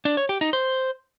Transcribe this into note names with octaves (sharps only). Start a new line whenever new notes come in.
D4
C#5
G4
D#4
C5